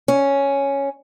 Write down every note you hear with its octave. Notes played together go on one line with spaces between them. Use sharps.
C#4